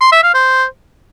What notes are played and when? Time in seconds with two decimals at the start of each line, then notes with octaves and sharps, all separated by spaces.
0.01 C6
0.12 E5
0.23 F5
0.34 C5